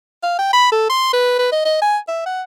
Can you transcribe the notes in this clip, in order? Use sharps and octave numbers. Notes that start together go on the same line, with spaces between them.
F5
G5
B5
A4
C6
B4
B4
D#5
D#5
G#5
E5
F#5